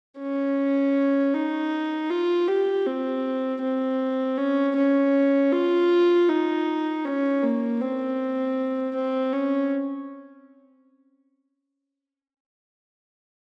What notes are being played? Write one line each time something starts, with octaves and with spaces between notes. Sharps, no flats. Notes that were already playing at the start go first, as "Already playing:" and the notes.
C#4
D#4
F4
G4
C4
C4
C#4
C#4
F4
D#4
C#4
A#3
C4
C4
C#4